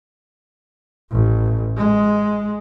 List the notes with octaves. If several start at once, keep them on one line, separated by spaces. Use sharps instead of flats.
A1
G#3